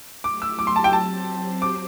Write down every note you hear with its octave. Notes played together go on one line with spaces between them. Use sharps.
F#3 A3 E4 G4 D6
E6
D6
C6
A5
G5
F#3 C4 G4 C5 A5
D6